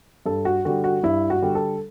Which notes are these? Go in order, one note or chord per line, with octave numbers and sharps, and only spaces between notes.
G2 A4
F#4
D3 G3 F#4
F#4
G2 E4
F#4
D3 G3
A4